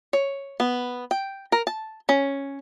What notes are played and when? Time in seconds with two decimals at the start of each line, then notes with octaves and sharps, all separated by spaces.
0.13 C#5
0.60 B3
1.11 G5
1.52 A#4
1.67 A5
2.09 C#4